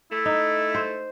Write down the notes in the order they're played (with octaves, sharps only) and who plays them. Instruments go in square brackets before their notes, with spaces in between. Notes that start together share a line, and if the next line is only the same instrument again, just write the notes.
[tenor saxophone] A3 [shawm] E4
[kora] D#4
C5